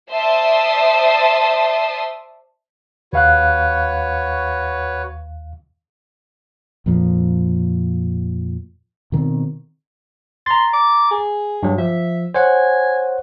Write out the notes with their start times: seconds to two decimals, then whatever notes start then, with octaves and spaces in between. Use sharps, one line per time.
0.11 C5 D5 E5 A5 C6 D#6
3.13 D#2 F#4 B4 C#5 F5 F#6
6.86 F2 A#2 F3
9.12 B2 D#3 C4
10.46 A#5 C6 A6
10.73 D6
11.11 G#4
11.63 G2 F#3
11.78 F3 E5
12.35 C5 C#5 F#5 G#5